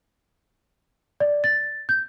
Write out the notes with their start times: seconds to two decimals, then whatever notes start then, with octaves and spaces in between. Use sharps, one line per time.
1.20 D5
1.44 A6
1.89 G6